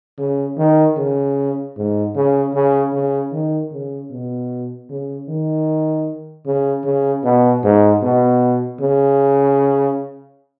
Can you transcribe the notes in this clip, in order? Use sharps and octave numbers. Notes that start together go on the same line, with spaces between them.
C#3
D#3
C#3
G#2
C#3
C#3
C#3
D#3
C#3
B2
C#3
D#3
C#3
C#3
B2
G#2
B2
C#3